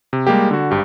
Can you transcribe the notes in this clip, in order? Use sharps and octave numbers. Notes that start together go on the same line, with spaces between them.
C3
G3 G#3 A#3 G4
D3 F#4
G#1 G2 G4